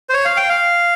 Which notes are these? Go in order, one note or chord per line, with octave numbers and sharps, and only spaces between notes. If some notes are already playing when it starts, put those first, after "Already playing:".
C5
C#5
F5
G5
F5